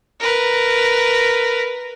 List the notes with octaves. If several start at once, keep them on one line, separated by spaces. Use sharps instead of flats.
A#4 B4